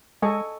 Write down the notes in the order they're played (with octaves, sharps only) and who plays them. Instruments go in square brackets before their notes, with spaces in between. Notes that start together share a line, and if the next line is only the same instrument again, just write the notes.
[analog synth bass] G#3 [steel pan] A4 D#5 G#5 C#6